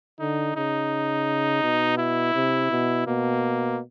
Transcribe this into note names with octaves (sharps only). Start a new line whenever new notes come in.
D3 D#4
C#3 D#4
B2
E4
C3
B2
B2 A#3